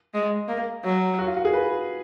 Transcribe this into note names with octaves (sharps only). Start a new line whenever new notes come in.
G#3
A#3
F#3
F#4
F4
F#4
G#4
B4